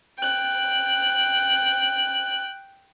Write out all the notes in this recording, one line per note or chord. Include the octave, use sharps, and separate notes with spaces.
G5 F#6